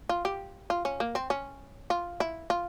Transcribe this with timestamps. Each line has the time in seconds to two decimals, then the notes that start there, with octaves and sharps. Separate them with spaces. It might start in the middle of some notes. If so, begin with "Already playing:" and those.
0.09 F4
0.25 G4
0.70 F4
0.85 C#4
1.00 A#3
1.15 C4
1.30 C#4
1.90 F4
2.20 E4
2.50 F4